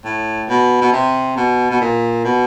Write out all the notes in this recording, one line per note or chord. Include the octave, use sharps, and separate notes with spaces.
A2
B2
B2
C3
B2
B2
A#2
B2